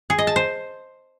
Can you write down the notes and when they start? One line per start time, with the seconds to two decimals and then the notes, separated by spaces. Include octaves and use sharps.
0.10 G#4
0.19 D#5
0.27 A5
0.36 C5